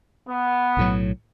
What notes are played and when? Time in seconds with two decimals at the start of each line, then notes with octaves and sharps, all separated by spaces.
0.28 B3
0.77 B1 A2 F#3